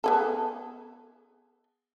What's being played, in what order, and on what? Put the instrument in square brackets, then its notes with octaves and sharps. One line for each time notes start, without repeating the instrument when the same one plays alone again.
[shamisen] B3 G#4 A4